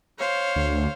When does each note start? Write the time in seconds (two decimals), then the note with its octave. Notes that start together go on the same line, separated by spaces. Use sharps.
0.19 C5 C#5 F5
0.56 D2